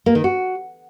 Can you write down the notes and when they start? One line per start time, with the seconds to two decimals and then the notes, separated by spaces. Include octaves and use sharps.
0.06 A#3
0.15 D#3
0.24 F#4